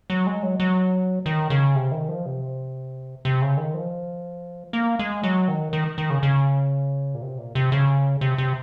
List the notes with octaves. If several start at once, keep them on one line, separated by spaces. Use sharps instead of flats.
F#3
G#3
F#3
F#3
D#3
C#3
C3
D#3
F3
C3
C3
C#3
D#3
F3
A#3
G#3
F#3
D#3
D#3
D#3
C#3
C#3
A#2
C3
A#2
C3
C#3
C3
C3